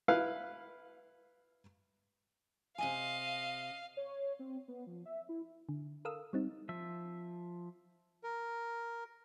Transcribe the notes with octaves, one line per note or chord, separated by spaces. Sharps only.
E4 B4 F5
C3 D#5 F5 G#5
C#5
C4
B3
F3
E5
E4
D3
A4 A#4 F5 D#6 E6
G3 C4 D#4
F3 E5
A#4